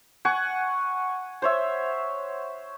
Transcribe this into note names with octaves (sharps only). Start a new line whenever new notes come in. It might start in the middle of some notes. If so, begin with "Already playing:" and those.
F#5 G#5 C#6
C5 C#5 E5